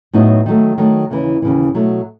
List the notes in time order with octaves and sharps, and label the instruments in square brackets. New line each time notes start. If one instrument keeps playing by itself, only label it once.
[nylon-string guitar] A2 F#3 B3 D#4 F#4
D#3 F#3 A3
D#3 F#3 A3
D#2 C#3 E3
D#2 C#3 E3
B2 F#3 A3